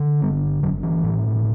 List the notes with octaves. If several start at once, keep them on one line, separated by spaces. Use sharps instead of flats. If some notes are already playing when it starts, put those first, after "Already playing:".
Already playing: D3
G1 G3 B3
G1 D3 F#3
E3
A2